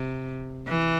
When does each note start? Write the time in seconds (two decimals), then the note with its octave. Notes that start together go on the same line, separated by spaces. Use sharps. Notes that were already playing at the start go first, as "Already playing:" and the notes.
Already playing: C3
0.68 E3